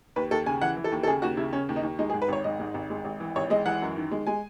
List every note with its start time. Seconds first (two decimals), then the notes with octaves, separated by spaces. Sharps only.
0.16 D#2 B4
0.31 D#2 A4
0.46 C#3 G#5
0.62 E3 F#5
0.77 E3
0.84 A4
0.92 D#2
1.03 A4
1.07 C#3 G#4
1.22 D#2 F#4
1.37 C#3 E4
1.53 C#3 C#4
1.69 D#2
1.76 D#4
1.83 D#2
1.99 G#3 D#4
2.10 G#4
2.13 G#2
2.22 B4
2.28 G#1 C#5
2.44 G#2 D#5
2.59 G#2
2.74 G#1
2.90 G#3
3.05 G#1
3.20 E3
3.36 G#1 C#5
3.50 G#3 D#5
3.65 E3 F#5
3.82 F#2
3.97 D#3
4.11 G#3
4.27 G#3 G#5